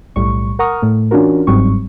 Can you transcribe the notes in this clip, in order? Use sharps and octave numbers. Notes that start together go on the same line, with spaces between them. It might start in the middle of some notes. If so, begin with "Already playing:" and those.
B1 A2 G3 C#6
A#4 F#5 A#5 C#6 D#6 F6
A2 A3
E3 C#4 D4 F4 F#4 A#4
G1 G#2 F#3 G3 C4 C#6